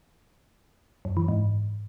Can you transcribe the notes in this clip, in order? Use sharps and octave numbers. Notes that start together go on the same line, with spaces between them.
F#2
E3
G#2